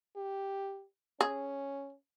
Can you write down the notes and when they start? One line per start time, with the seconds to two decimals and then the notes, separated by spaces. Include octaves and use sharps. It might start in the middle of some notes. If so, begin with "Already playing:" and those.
0.16 G4
1.21 C#4 G#4